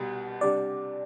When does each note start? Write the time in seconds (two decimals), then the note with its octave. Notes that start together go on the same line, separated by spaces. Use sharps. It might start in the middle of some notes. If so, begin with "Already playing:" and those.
Already playing: C2 B2 G3
0.41 C3 G3 D4 D5